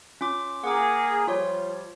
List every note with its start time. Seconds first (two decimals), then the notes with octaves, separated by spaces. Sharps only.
0.21 C#4 F4 D6
0.64 A#3 G#4 F#5 D6
1.28 F3 G3 F4 C#5